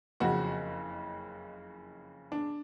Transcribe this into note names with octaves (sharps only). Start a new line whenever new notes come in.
F#1 F2 C#3 F#4
D4